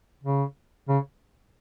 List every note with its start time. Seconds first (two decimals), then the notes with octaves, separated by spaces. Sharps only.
0.24 C#3
0.88 C#3